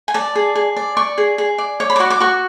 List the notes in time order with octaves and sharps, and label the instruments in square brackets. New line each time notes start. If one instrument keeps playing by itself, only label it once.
[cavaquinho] G#5
D5 A5
G#4
G#4
D5
D5 C#6
G#4
G#4
D5
C#5 D6
B5
D6
F#4 C#6
D6
F#4 C#6